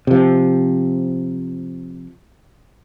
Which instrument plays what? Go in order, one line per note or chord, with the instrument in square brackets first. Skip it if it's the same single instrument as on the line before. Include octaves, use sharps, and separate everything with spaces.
[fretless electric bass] C3 F3